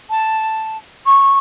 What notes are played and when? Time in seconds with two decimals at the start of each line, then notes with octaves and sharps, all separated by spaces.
0.10 A5
1.06 C#6